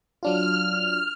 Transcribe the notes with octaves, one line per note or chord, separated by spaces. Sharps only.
F#3 D4 F4 F6